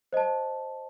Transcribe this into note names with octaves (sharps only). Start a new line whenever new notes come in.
C5 D#5 A5